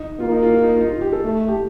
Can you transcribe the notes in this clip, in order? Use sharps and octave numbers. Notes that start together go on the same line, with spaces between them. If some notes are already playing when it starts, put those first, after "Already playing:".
Already playing: D#4
A#3 F4
D#4
F4
F4
D#4
F4
D#4
F4
G4
A4
A3
G4